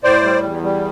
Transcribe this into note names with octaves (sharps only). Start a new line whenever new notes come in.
A2 C5 D5
G3
E2
G3